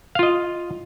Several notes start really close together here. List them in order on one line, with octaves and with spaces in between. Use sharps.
F5 F4 D#5